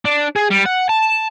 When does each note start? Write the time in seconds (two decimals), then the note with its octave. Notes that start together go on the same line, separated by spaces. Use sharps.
0.05 D4
0.36 G#4
0.50 G3
0.66 F#5
0.89 A5